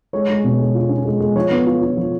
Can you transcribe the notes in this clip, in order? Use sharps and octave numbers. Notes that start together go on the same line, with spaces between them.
G#3 C#5
G#3
B2
G#3
F4
C#4
G#3
G#3
F3 C#5
B3
F4
F4
F3